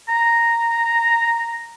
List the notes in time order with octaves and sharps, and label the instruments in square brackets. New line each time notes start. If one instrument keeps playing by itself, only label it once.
[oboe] A#5